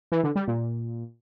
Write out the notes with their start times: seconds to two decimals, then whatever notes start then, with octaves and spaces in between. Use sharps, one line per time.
0.12 E3
0.24 D3
0.36 G3
0.48 A#2